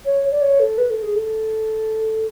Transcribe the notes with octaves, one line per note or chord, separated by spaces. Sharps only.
C#5
D5
C#5
A4
B4
A4
G#4
A4